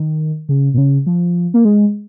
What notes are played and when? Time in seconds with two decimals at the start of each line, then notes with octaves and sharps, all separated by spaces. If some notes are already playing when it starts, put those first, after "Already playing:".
Already playing: D#3
0.49 C#3
0.74 A#2
0.78 C#3
1.06 F3
1.54 A#3
1.65 G#3